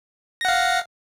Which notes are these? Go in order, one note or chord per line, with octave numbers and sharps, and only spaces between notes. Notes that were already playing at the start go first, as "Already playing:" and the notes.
F5 F#5 A#6